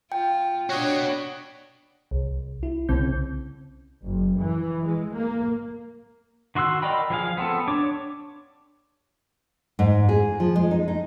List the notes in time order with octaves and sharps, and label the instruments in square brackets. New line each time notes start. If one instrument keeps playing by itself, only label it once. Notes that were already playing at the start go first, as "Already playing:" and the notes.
[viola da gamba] F4 [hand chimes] G5
[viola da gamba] D4 [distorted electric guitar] F#4 D#5 [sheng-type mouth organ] C#5
[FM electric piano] C2
E4
C2 C#3 C4 G6
[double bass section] F#1
E3
G#3
A#3
[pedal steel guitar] D#3 F#4 C6 E6 F#6
A#4 D5 D#5 G5 B5
F3 G#4 F5
B3 C4 A4
D4 C#5 D6
[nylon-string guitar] G#2
G#4
F3
G#3
D#4
D#4